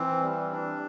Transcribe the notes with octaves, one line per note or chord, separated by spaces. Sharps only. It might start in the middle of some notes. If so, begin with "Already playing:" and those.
Already playing: E3 C4
G3
D4